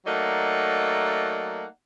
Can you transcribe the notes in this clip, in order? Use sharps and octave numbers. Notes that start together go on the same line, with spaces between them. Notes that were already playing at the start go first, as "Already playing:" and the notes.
F#3 A3 A#3 D#4 D5 F#5